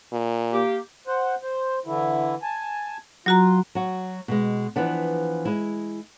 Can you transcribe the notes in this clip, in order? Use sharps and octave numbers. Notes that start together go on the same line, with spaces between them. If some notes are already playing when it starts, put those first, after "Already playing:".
A#2
A#3 G4
C5 F#5
C5
D3 E3 E4
G#5 A5
F#3 F4 F#4 A#5
F#3 F#4
B2 G#3
E3 F3 B3 D4
G#3 E4